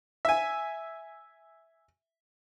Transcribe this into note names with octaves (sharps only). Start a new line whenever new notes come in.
E5 G#5